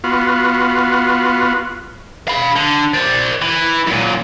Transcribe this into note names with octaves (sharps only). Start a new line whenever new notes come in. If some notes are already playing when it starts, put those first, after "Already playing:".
B3 F4 F#4
F5 B5
D3
C5 D5
E3
F#2 A#2